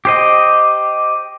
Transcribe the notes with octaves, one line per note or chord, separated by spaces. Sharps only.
G4 C5 D#5